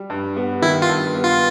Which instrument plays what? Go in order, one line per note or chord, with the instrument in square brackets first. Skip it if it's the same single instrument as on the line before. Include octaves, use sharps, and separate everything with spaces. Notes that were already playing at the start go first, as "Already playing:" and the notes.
Already playing: [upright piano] G3
G2
B3
[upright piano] D#3 [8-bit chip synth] E4
[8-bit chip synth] F4
[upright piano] G2
B3
[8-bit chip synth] F4